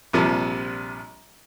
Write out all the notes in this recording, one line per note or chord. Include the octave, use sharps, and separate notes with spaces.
A#1 C3 F3 G3